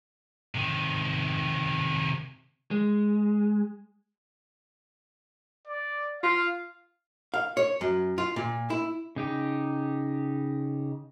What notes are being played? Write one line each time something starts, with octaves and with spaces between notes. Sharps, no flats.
C3 D#3
G#3
D5
F4 F5
F5
C#5
F#2
F4
A#2
E4
C#3 D#4 G4